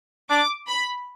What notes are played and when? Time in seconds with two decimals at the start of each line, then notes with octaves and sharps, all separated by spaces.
0.30 D4 D6
0.68 B5